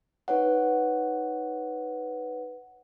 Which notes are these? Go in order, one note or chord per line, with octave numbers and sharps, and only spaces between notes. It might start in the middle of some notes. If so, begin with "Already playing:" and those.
D#4 B4 C#5 F#5